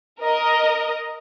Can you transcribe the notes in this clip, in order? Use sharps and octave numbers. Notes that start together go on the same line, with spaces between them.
A#4 D#5